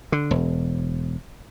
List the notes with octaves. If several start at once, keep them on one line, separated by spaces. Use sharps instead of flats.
D3
E1